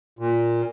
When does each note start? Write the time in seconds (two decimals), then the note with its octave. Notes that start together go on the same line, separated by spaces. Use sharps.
0.19 A#2